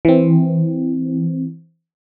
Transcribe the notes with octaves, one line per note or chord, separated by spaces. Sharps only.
E3 C4